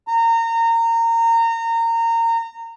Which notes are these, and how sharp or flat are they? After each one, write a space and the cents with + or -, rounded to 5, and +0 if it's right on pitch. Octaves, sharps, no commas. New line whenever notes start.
A#5 -25